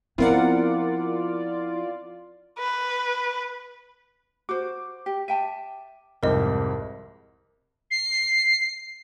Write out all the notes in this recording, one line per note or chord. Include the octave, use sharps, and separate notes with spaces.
F3 B3 C4 E4 F4 A#4 D5 F#5
B4
F#4 C5 D6
G4
E5 G5 A5 D#7
C2 F2 G#2 A#4 C5 D#5
C7